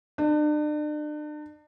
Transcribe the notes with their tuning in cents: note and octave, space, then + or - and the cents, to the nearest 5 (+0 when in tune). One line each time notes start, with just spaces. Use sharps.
D4 +40